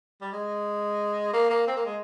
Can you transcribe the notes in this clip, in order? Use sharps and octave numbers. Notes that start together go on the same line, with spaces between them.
G3
G#3
A#3
A#3
C4
A#3
G#3